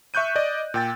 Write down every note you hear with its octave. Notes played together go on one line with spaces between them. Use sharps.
E5 C#6 F#6 G6 D#7
D5 D#5
A#2 G5 A6